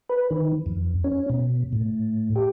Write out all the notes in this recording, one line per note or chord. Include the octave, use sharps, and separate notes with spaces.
B4
D#3
F2
C#4
B2
A2
G4